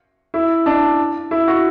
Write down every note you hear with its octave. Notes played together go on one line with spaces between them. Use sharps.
E4
D4
E4
F#4